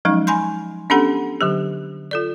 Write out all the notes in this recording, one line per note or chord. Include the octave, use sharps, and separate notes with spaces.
F3 F#3 G#3 C#4 D#4
G#5 B5 C6 G6
B3 C#4 D4 G4 A4 F#5
D3 F#3 G4
F4 A4 D5